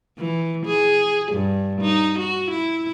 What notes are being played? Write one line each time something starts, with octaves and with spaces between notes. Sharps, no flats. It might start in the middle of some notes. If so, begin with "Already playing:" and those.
E3
G#4
G2
D#4
F#4
E4